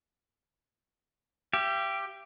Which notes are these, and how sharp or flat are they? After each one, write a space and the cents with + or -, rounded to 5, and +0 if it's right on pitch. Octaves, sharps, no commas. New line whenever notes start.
G4 +0 E5 +45